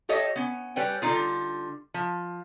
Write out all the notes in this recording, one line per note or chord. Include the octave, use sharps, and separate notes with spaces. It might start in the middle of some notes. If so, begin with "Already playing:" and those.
G4 A4 C#5 D#5 E5
B3 C#4
G3 B4 C#5 G5 G#5
D3 G3 D#4 F4 G#4
F3